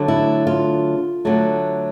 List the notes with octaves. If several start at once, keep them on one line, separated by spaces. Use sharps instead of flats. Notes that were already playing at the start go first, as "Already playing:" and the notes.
Already playing: D3 F#3 A3
E4
F4
D3 F#3 A3